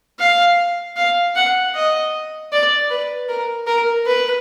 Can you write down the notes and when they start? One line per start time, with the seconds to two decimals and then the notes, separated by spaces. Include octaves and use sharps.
0.19 F5
0.96 F5
1.35 F#5
1.74 D#5
2.52 D5
2.90 B4
3.29 A#4
3.67 A#4
4.06 B4